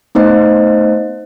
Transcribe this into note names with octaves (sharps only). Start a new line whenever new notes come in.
A3 B3 D#4 C5 D#5